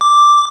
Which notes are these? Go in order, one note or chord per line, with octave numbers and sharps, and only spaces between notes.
D6